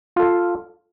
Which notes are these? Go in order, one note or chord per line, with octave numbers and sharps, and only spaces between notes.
F4 A4 F5